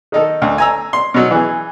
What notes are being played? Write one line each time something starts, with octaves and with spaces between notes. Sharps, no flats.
D#3 D#4 A4
D2
G#5 A#5 E6
C6
B2 F#3 D#4
E3 G#4